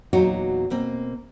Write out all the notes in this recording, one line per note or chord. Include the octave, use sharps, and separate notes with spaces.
E2 A#2 F#3 D#4 F#4 C#5
B2 A#3 C4